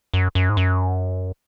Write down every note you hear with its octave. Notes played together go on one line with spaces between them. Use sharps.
F#2
F#2
G#2
F#2